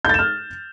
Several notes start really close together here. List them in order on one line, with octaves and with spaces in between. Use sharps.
G6 A6 E7 F6